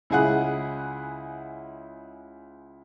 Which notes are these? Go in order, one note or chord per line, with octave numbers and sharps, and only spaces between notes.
C#2 E4 G#4 F#5 F#6